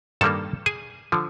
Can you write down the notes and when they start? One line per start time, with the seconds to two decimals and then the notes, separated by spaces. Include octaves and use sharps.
0.21 G2 D#3 G3 A#3 A4 A5
0.66 G#4 G#5
1.12 D3 F3